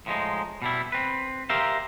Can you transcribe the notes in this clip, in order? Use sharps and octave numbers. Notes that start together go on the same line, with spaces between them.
A2 F3 G#3 D#4
B2 G3 E4
C4 B4
G4 A#4 C5 E5 F5